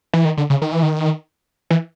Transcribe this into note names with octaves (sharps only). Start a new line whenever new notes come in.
E3
D#3
D3
C#3
D#3
E3
D#3
E3